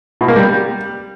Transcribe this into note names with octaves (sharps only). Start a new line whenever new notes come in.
B2
A#3
G3